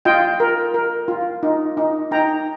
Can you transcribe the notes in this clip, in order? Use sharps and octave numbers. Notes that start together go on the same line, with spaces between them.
F4 D#5 G5
A#4
A#4
F4
D#4
D#4
D#4 G5 A#5